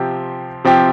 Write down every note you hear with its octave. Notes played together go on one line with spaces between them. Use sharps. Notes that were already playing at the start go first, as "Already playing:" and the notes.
Already playing: C3 F3 C4 G4
C3 F3 C4 G4